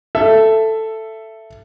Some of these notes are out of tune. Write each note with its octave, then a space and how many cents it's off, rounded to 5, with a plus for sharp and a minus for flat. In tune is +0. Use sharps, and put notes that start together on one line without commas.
A4 +5 E5 +15